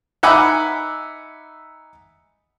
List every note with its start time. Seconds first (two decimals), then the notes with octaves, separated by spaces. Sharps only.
0.23 D#4 E5 F#5 G#5 B5 D6